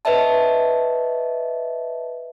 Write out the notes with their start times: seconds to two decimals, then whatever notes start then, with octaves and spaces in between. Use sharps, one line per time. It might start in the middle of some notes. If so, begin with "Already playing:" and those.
0.05 B4 C#5 D#5 E5 A5